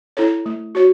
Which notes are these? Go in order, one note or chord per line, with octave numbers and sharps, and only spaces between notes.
E4 A4 C#5
A3
F#4 C#5